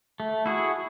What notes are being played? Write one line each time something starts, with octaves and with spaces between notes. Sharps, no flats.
A3
E4 F#4 G#4